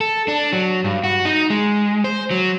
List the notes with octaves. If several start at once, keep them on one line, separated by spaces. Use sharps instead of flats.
A4
D4
F#3
G2
F#4
D#4
G#3
C5
F#3